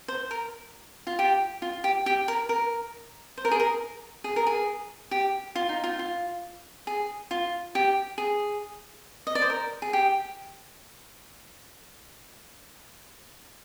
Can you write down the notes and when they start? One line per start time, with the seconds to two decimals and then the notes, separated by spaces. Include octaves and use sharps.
0.08 C5
0.31 A#4
1.07 F4
1.19 G4
1.62 F4
1.84 G4
2.06 G4
2.28 A#4
2.49 A#4
3.38 C5
3.45 A#4
3.51 G#4
3.60 A#4
4.24 G#4
4.36 A#4
4.47 G#4
5.11 G4
5.55 F4
5.69 D#4
5.84 F4
5.99 F4
6.87 G#4
7.31 F4
7.75 G4
8.18 G#4
9.27 D#5
9.35 D5
9.42 C5
9.50 A#4
9.82 G#4
9.93 G4